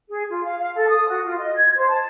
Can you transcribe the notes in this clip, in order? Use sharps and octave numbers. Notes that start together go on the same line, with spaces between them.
G#4
F4
F5
F5
A4
D#6
F#4
F4
D#5
G#6
C5
A5